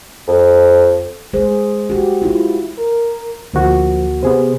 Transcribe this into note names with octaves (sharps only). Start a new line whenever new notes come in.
F2
G#3 G#4 C5
F#4 G4
E4 F4
A#4
D2 F3 A#3 F#4
C3 B3 G#4 C5